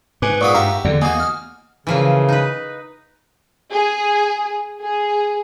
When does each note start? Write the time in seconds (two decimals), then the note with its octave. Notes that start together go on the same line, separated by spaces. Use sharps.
0.22 G#2 B4 G#5 D6
0.41 A#2 B3 G#4 D5 C#6
0.55 G2 F#4 G4 E5 F5 A#5
0.85 E2 D3 D5
1.02 A#3 D#4 F#4 G#5 D#6
1.20 F6
1.87 C#3 E3 F3 A#3
2.29 D#4 B4
3.72 G#4
4.81 G#4